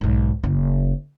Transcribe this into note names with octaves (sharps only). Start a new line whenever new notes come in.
B1 G#2
F#1 C#4